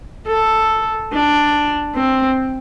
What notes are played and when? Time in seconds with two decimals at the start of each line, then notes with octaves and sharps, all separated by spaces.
0.28 A4
1.13 D4
1.96 C4